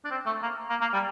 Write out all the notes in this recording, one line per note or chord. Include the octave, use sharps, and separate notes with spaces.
D4
C4
A3
A#3
A#3
A#3
G3